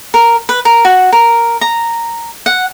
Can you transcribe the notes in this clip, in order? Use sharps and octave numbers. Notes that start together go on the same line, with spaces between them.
A#4
B4
A#4
F#4
A#4
A#5
F#5